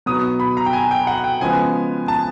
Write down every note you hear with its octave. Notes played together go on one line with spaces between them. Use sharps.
B2 F#3 B3 D#4 D#6
B5
A#5
G5
G#5
G5
F#5
G5
C#3 F3 G#3 B3 G#5
A5